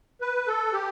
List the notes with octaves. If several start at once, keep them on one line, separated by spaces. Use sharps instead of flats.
B4
A4
G4